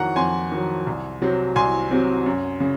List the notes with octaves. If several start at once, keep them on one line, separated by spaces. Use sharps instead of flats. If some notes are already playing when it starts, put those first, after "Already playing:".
Already playing: F2 D#3 F#3 F#5 A#5 C#6
F2 G#5 C6
D#3 F#3
C2
C3 F#3 C4
C2 G#5 C6
C3 F#3 C4
F#2
C#3